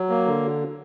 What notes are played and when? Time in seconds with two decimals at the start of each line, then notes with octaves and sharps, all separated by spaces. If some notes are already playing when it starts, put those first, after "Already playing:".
Already playing: F#3
0.10 A#3
0.26 D3